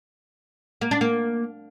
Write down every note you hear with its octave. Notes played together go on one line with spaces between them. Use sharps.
A#3
D4
A#3